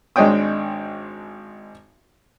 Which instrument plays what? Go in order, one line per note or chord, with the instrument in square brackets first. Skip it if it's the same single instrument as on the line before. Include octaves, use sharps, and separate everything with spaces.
[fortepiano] G#1 G#3 D4 C#5 G5 D#6